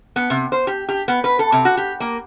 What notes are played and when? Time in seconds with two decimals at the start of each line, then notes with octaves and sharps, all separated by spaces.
0.16 B3
0.30 C3
0.52 C5
0.67 G4
0.89 G4
1.08 B3
1.24 B4
1.39 A4
1.52 C3
1.65 F#4
1.77 G4
2.00 A#3